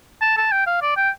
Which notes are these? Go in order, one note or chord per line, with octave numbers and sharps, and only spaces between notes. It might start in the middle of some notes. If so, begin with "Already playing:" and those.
A5
A5
G5
F5
D5
G5